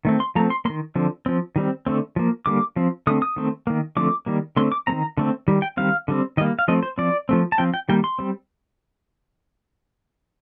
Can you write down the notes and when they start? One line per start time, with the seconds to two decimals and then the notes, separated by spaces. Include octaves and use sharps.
0.05 D#3 A3 C4
0.20 C6
0.35 F3 A3 C4 A#5
0.50 C6
0.65 D#3 A#3 C6
0.95 D3 F3 C4
1.26 F3 C4
1.56 D#3 G3 C4
1.86 D3 A3 C4
2.16 F3 A#3
2.46 D3 G3 A#3 D6
2.76 F3 C4
3.07 D3 A3 C4 D#6
3.22 D#6
3.36 D#3 A3 C4
3.67 D#3 A#3
3.97 D3 F3 A3 C4 D6
4.26 D#3 G3 A#3
4.57 D3 A3 C4 C6
4.72 D6
4.87 A3 C4 A#5
4.92 D#3
5.17 D3 A3 C4
5.48 D#3 G3
5.62 G5
5.77 D#3 G3 C4 F5
6.08 D3 G3 C4
6.37 D#3 G3 A#3 D#5
6.59 F5
6.68 F3 A3 C4 D#5
6.83 C5
6.98 F3 C4 D5
7.29 F3 A3 C4
7.52 A5
7.58 F3 C4 G5
7.74 G5
7.89 D#3 G3 A#3 G5
8.04 C6
8.19 G3 C4